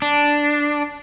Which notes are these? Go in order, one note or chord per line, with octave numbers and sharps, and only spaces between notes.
D4